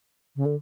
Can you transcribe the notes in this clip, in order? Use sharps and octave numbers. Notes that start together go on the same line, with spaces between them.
C#3
D3